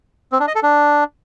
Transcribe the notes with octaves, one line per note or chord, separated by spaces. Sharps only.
C4
D4
D#5
A4
D4